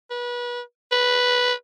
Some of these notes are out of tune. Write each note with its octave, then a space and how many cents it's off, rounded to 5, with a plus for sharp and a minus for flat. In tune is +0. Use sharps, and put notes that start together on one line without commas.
B4 -30
B4 -5